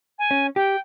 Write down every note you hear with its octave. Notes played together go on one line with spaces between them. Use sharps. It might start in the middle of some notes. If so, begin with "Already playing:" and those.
G#5
C#4
G4 G5